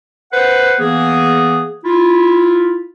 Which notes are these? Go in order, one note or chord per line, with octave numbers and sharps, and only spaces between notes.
B4 C5 F#5
E3 A#3 B3 G#4
E4 F4